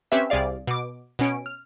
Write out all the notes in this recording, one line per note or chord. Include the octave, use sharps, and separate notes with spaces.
C4 C#4 G4 B4 E5
C2 C3 G#4 D5 F5
B2 D6
B2 C#4 D7
F6